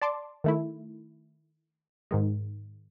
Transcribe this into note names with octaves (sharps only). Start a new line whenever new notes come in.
D5 A5 C6 D6
D#3 A3 E4
G#2 D#3 G#3